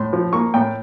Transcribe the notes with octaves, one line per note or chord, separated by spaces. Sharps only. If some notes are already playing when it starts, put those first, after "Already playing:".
Already playing: A2 C6
F3
A#3 C#6
A2 G5